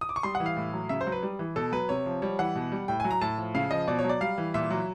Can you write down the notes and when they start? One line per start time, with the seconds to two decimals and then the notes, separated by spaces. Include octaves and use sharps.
0.01 D#6
0.09 D6
0.16 C#6
0.23 G3 C6
0.35 F#5
0.40 E3
0.46 F5
0.56 A2
0.73 F#3
0.89 C#3 E5
1.01 C5
1.06 F#3
1.12 B4
1.23 G3
1.39 E3
1.56 B2 A4
1.72 F#3 B4
1.89 C3 C#5
2.06 F3
2.22 G3 C#5
2.39 E3 F#5
2.55 B2
2.72 G3
2.88 A2 G5
3.00 F#3 G#5
3.11 A#5
3.21 A2 A5
3.38 F3
3.55 C#3 F5
3.71 F3 D#5
3.87 B2 D5
3.99 C#5
4.04 F#3
4.09 D5
4.21 G3 F5
4.38 E3
4.54 A#2 E5
4.70 F#3